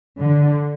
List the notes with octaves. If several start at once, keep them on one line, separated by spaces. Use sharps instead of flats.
D3